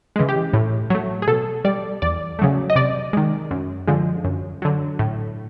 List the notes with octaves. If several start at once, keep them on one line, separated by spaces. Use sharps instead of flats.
C#3 E3 G#3
G4
A2
F#3 A3
G#4
B2 A4
G3 D5
E2 D5
C#3 F#3 A3
D#5
C3 D5
D#3 G#3
F#2
D3 F3 G#3
F#2
D3 F#3
A2